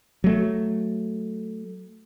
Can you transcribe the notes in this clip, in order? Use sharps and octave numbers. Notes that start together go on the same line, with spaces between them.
F#3 A3